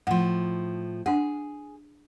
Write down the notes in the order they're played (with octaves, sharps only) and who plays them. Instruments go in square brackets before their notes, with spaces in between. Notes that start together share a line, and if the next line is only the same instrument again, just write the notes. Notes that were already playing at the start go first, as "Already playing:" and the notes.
[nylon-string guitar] A2 F3 [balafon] F#5
[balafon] D4 F#5 [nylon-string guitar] G#4